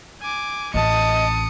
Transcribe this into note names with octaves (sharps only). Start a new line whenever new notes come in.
G#5 D6
A1 C#4 D#5 A5 D#6 C#7